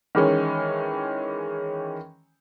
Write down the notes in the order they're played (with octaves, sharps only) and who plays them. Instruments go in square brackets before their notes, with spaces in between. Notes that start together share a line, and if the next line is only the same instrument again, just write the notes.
[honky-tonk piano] D#3 E3 G#3 C#4